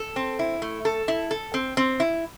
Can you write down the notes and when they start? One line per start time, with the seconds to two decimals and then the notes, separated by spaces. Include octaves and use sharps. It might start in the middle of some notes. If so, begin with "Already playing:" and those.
Already playing: A4
0.16 C4
0.39 E4
0.62 A3
0.85 A4
1.08 E4
1.31 A4
1.54 C4
1.77 C4
2.00 E4